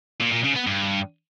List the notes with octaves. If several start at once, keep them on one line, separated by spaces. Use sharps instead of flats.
A#2
A#2
C#3
B3
G2